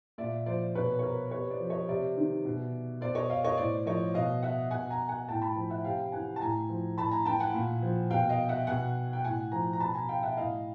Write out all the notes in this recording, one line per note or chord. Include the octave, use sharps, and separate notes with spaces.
A#2 D5 E5
F3 C5 D5
B2 B4 C#5
C#5
A#4 C5
C3 B4 C#5
C5 D5
F3
C#5 D#5
C3 D5 E5
D#3
B2
B2 C5 D5
C#5 D#5
D#5 F5
C#5 D#5
A2 C5 D5
F3 C#5 D#5
B2 D#5 F5
E5 F#5
B2 F#5 G#5
G#5 A#5
F#5 G#5
A2 G5 A5
A5 B5
F3
E5 F#5
C3 F5 G5
E3 F#5 G#5
A5
A2 G#5 A#5
F3
A2 A5 B5
G#5 A#5
E3 G5 A5
F#5 G#5
A#2
F3
B2 F5 G5
D#5 F5
E5 F#5
B2 F#5 G#5
G5
A2 F#5 G#5
F3 G#5 A#5
A#5
B2 A5 B5
G#5 A#5
F5 G5
E5 F#5
A2 D#5 F5